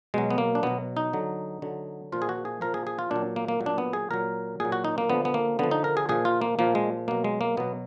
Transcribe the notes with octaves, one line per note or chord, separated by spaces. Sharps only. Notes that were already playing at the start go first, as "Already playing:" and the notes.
B2 F#3 G#3
B3
A#3
D4
B2 F#3 B3
D#4
D3 F#3
D3 F#3
A#2 F3 F4
G#4
F#4
G#4
A#2 F3 A#4
G#4
G#4
F4
A#2 F#3 D4
A#3
A#3
A#2 F#3
D4
B3
G#4
A#2 F#3 A#4
A#2 F#3 G#4
F#4
D#4
A#3
D3 F3 B3
B3
A#3
D3 F3 B3
D#4
A#4
G#4
A#2 F3 G#4
F4
A#3
A#2 F3 A#3
G#3
B2 F#3 A#3
G#3
A#3
B2 F#3 B3